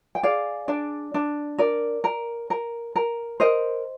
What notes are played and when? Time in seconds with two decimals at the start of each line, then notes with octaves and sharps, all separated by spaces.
0.15 G5
0.23 G#4 D5 F5
0.68 D4 D5
1.14 D4
1.58 A#4 D5
2.04 A#4
2.50 A#4
2.96 A#4
3.40 A#4 C5 D#5